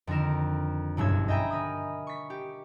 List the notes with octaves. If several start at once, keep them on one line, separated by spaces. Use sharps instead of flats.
F2 D3 D#3 A#4 E7
F#1 B1 G2 E6 G#6
D#5 E5 G5 G#5 A#5 B5
A#4 B5 D#6
C#6 B6
G4